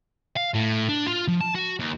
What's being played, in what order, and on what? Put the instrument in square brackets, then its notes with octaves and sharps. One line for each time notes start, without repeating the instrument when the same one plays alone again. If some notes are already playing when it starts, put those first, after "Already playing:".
[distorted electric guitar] F5
A2
D4
F4
F3
A5
F#4
D#2